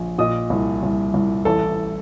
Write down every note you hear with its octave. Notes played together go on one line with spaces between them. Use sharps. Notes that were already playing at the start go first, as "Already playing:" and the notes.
Already playing: A#1
A#2 D#5 D#6
C2
C2
C2
A1 A4 A5